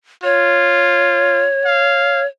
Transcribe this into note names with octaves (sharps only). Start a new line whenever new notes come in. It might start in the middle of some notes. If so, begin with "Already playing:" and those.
F4 C#5
F5